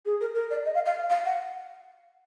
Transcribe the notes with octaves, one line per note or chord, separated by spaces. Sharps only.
G#4
A#4
A#4
D5
D#5
F5
F5
F5
F#5